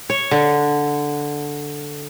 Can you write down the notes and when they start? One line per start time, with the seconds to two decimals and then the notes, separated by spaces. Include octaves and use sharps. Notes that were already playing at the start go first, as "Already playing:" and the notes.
0.10 C#5
0.31 D3